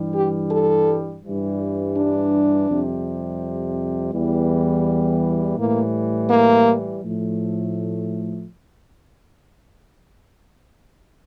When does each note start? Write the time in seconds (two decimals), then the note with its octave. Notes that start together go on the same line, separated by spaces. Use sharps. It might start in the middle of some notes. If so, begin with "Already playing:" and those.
Already playing: G2 E3 G3
0.15 G4
0.51 A4
1.24 G2 E3 G3
1.96 D4
2.69 F2 C3 G3
4.13 E2 E3 G3
5.58 A2 E3 G3 A#3
6.30 A#3
7.02 A2 F3 A3